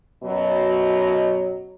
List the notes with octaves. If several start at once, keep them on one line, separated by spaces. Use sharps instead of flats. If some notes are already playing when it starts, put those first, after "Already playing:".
F#2 B2 F#3 D#5